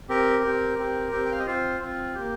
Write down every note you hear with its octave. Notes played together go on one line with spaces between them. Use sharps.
C4 G4 A#4
C4 G4
C4 G4
C4 G4
G5
F5
D#5
C4 F4 C5
C4 F4
A#3 G4